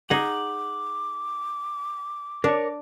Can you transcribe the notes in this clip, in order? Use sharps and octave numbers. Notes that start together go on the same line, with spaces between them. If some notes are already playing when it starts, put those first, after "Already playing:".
D#4 G#4 F#5 D6
D4 A#4 C#5